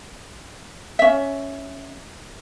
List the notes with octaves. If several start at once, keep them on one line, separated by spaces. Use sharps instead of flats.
C#4 E5